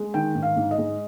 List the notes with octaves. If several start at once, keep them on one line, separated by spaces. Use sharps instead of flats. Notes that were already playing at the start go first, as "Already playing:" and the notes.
Already playing: G#3
D#3 G5
G#2
F5
G#2
D#5
G#3